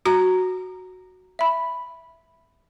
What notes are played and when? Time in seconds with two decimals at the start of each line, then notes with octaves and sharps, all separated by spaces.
0.06 F#4 A#5
1.39 E5 B5